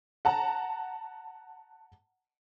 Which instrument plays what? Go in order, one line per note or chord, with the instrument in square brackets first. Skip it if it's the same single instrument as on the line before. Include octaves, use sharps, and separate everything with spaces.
[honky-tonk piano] F#5 A5 A#5